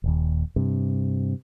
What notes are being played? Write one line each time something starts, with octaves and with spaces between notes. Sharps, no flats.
D#1 D#2
G2 C3